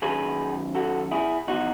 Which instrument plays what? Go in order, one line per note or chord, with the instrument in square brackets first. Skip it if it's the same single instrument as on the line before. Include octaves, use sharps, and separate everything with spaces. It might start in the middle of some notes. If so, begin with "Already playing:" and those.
[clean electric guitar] F#2 D#3 F#3 G#4 B4
F#4 A4
E4 G#4
E2 D#3 F#3 D#4 F#4